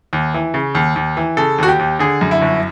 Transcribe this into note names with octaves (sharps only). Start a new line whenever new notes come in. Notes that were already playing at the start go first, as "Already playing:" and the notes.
D#2
E3
C#3
D#2
D#2
E3
C#3 A4
D#2 F#4
G4
D#2
D3 G#4
F#2
E4
G1